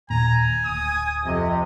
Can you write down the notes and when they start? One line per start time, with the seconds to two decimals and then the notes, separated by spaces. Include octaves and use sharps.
0.10 D#2 A#2 G#5 A#5
0.65 D1 D#6
1.25 F2 C3 D#5